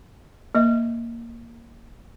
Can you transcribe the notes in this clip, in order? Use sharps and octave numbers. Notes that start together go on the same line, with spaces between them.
A#3 D#5